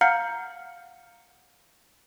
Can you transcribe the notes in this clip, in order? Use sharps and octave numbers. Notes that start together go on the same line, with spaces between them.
F5 F#5 A#5 F6 G6 C#7